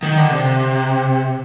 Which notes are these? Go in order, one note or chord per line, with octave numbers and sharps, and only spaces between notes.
D#3
D3
C3